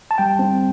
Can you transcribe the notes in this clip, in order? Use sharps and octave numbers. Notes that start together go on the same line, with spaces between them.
A5
G3 G5
C4